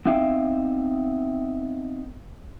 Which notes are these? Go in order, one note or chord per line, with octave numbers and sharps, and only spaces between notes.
B3 C4 D#4 E5 F5 G5